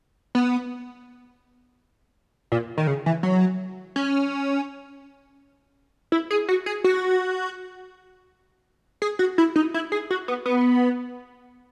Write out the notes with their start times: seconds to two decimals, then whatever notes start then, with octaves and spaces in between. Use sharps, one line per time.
0.35 B3
2.52 A#2
2.78 D#3
2.87 C#3
3.06 E3
3.23 F#3
3.96 C#4
6.12 E4
6.31 G#4
6.49 F#4
6.66 G#4
6.84 F#4
9.02 G#4
9.19 F#4
9.38 E4
9.56 D#4
9.74 E4
9.92 G#4
10.11 F#4
10.28 B3
10.46 B3